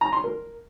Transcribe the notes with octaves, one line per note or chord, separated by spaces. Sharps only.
A#5
C6
A#4